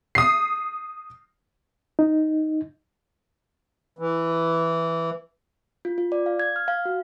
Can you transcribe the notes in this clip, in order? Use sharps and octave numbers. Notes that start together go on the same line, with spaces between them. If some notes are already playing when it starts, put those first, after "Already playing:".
D#6 C7
D#4
E3
F4
F4
D5
F5
G#6
F6
F5
F#4